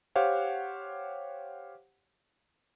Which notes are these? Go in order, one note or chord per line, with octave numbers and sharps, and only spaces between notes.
G4 C5 C#5 F5 F#5